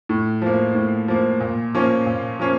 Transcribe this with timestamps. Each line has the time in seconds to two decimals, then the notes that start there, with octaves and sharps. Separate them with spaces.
0.09 A2
0.42 F3 A#3
0.75 A2
1.08 F3 A#3
1.40 A#2
1.74 F3 A#3 C#4
2.06 A#2
2.39 F3 A#3 C#4